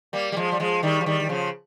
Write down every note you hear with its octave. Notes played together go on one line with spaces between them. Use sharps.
G3 A#3
G3
F3 G#3
G3
F3 G#3
D#3 G3
F3
D#3 G3
D#3
C#3 F3